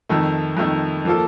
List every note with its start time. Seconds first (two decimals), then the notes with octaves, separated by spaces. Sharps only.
0.09 F2 D#3 A3
0.57 F2 D#3 A3
1.05 F3 A#3 F4 A4